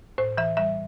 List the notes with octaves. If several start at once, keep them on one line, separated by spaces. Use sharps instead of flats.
A2 C5
E3 E5
G3 E5